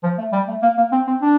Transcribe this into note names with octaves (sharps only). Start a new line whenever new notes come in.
F3
A3
G3
A3
A#3
A#3
C4
C4
D4